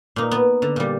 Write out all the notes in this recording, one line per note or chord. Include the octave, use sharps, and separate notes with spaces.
A#2 D#4
B3
D3
A#2 G3